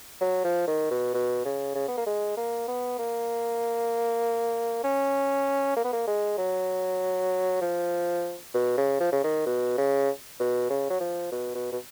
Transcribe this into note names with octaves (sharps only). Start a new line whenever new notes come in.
F#3
F3
D#3
B2
B2
C#3
C#3
B3
A#3
G#3
A#3
B3
A#3
C#4
A#3
B3
A#3
G#3
F#3
F3
B2
C#3
F3
C#3
D#3
B2
C#3
B2
C#3
F#3
F3
B2
B2
B2